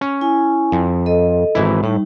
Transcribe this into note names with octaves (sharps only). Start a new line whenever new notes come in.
C#4
E4 G#5
F2
A4 D#5
G#1 E3 E4
A2 G3 D#4